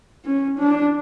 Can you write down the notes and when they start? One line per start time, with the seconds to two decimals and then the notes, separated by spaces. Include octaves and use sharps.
0.25 C#4
0.59 D4